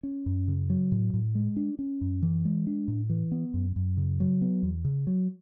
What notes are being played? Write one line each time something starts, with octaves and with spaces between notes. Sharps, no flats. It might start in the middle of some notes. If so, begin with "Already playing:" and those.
C#4
F#2
C#3
F#3
A2
A2
G#3
D4
C#4
F#2
E3
G#3
D4
A2
E3
B3
F#2
F#2
C#3
F#3
B3
E2
C#3
F#3